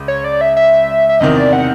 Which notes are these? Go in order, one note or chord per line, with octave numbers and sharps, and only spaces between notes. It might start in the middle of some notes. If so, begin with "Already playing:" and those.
Already playing: C#2
C#5
D5
E5
E5
E5
E2 C3 D#3 D#5
D5
F#5